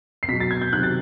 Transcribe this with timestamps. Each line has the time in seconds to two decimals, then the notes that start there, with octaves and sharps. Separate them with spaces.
0.23 C7
0.28 B2 F#3 B6
0.40 A6
0.51 G#6
0.62 G6
0.72 C3 D#3 F#3 F#6
0.83 A6